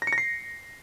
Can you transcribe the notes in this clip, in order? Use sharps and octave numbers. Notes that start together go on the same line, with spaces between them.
A#6
C#7
A#6
C7